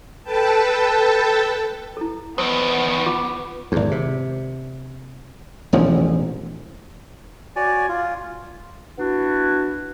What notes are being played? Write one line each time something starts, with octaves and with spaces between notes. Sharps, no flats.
A4 B4 G5 A5
E4 A4
E2 D#3 B3 C5 D#6 E6
F4 C#6 D6
G#1 E2
C3
E1 A1 A#2 F3
F#4 C#5 D5 G#5
F4
B3 D4 E4 F#4